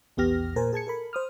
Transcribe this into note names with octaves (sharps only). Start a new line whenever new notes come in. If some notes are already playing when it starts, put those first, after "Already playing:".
A#1 E2 B3 G4 F6 A#6
A#2 A#4 C5 G#5
G#4 A5 G#6 C#7
A4 A#4 B5
C5 D#6 F6